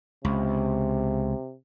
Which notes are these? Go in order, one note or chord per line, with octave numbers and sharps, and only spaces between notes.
C#2 C3